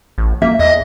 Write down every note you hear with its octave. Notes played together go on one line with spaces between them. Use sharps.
A1
A#3 E5
E2 D#5